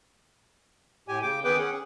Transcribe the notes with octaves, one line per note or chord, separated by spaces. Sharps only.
A2 G4 G#5
C#3 G5 D6
D#3 B3 G#4 B4 G5 D6
C#4 G#4 F#5
G#4